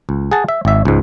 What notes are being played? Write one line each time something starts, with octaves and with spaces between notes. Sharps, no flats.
C#2
G#4 F#5 A5
E5
G#1 E5
C#2 G#2